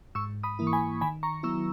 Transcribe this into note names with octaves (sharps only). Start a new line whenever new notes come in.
G#2 C#6 E6
B5 D#6
E3 A#3 E4
C#6
G#5 B5
D#3 G#5 B5
A#5 C#6
F#3 B3 E4 C#6 E6